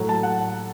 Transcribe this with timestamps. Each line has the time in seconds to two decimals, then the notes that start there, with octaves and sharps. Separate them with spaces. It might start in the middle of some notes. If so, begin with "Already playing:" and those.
Already playing: A2 F#3 A3
0.09 A5
0.23 F#5